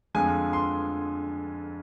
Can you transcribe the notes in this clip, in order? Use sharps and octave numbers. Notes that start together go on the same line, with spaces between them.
F2 D3 F3 G#3 G#5
C6